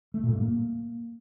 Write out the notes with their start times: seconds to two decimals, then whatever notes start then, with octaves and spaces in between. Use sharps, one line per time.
0.14 A3
0.23 A#2
0.32 G2
0.42 A#3